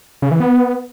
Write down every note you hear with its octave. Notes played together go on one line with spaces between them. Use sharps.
C#3
E3
B3